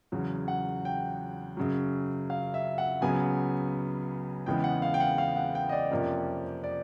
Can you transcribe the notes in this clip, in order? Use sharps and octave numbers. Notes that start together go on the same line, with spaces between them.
E2 C#3 F#3
F#5
G5
F#2 C#3 F#3
F5
E5
F#5
C#2 C#3 F#3 B3 G#5
E2 C#3 E3 G#3 B3 G5
F#5
F5
G5
F#5
F5
F#5
G5
D#5
D5
F2 C3 F3 A#3 C#4
D5